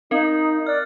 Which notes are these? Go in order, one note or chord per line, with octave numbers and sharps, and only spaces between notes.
C4 D#4 A#4
D5 F6 F#6